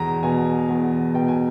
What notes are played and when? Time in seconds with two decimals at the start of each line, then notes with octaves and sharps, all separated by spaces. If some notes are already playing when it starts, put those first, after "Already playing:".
Already playing: E2 B2 A#5
0.23 B2 G#5
0.69 E2
1.14 B2 G5
1.28 G#5